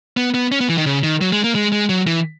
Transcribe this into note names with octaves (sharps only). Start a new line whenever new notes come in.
B3
B3
C#4
B3
E3
D#3
C#3
D#3
F#3
G#3
A#3
G#3
G#3
F#3
E3